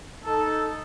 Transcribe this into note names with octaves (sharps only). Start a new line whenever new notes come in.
D#4 A4